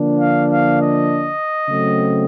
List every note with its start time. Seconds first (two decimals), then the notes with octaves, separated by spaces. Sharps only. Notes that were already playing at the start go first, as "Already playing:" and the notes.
Already playing: D3 F3 A#3 D4
0.19 F5
0.49 F5
0.79 D#5
1.68 C#3 F#3 A3 C4